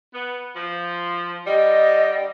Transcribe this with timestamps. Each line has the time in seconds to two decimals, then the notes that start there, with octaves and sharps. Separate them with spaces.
0.14 B3
0.56 F3
1.47 D3 G3 D#5